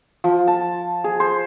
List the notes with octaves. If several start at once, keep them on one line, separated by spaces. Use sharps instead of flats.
F3
A5
G#4
C5